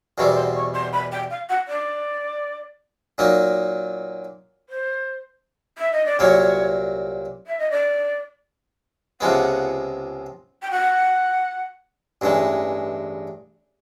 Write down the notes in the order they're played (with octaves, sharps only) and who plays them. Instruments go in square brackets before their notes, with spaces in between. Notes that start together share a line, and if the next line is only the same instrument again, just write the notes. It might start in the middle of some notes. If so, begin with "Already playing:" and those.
[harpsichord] E2 B2 G3 C4 [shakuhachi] C#6
[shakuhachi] C6
C#6
C6
B5
G5
F5
F#5
D5
[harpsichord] A#2 F#3 A#3 D#4
[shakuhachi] C5
E5
D#5
D5
[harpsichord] C2 A#2 F#3 A#3 [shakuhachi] C#5
[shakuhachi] E5
D#5
D5
[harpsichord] C#2 C3 F3 G#3 B3 [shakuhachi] F#5
[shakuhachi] G5
F#5
[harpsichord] A1 G2 E3 G#3